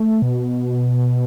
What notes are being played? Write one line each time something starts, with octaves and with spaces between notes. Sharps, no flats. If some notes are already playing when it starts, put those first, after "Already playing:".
Already playing: A3
B2